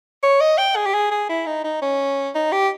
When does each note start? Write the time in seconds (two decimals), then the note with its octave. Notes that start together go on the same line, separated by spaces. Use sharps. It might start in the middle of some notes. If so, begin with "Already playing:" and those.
0.23 C#5
0.41 D#5
0.58 G5
0.76 G#4
0.86 G4
0.94 G#4
1.11 G#4
1.29 E4
1.46 D#4
1.64 D#4
1.82 C#4
2.35 D#4
2.52 G4